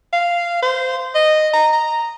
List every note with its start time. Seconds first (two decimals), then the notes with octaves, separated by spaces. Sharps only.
0.13 F5
0.62 C5
1.15 D#5
1.53 A#5
1.73 A#5